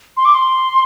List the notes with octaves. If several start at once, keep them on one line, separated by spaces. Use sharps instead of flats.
C6
D6
C6